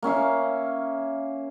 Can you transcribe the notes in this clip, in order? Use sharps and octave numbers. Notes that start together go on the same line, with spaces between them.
A#3 C#4 E5 F5